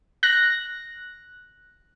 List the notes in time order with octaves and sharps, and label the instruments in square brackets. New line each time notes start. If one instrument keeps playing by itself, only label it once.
[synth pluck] F#6 A#6